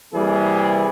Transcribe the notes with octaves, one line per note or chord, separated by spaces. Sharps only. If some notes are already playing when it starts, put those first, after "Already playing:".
C3 E3 G3 A#3 G#4